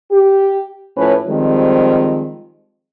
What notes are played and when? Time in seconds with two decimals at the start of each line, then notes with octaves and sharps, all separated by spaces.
0.11 G4
0.97 A2 F3 C#4 B4
1.27 D#3 F3 G3 G#3 C4